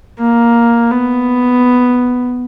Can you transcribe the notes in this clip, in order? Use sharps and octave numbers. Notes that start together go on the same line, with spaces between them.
A#3
B3